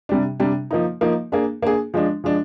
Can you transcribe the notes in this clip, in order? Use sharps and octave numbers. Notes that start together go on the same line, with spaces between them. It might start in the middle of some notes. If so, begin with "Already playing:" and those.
C3 G3 D4
C3 G3 D4
F3 A#3 D#4
F3 A#3 D#4
A#3 D4 G#4
A#3 D4 G#4
F3 G#3 D4
F3 G#3 D4